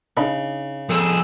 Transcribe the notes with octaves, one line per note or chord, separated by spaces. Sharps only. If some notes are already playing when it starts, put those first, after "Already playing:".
C#3 D4 D#4 B5
F2 G#4 A4 E6